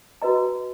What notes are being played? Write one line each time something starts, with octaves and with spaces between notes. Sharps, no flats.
F#4 B4 D#5 A#5